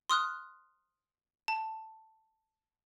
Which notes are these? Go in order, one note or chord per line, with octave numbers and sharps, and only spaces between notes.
C6 D#6 F6 F#6
A5